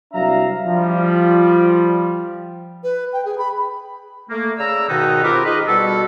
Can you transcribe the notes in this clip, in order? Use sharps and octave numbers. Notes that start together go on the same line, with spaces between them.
C2 F#3 D4 E5 F5 A#5
F3 G3
B4
G5
G#4
B5
A3 A#3
C#3 D5 A#5 E6
G#2 B2 D#3 B3 D#4
C4 F4 G4 A#4 B4
D#4 F4 G#4 B4 D#5
B2 G3 F#4 A4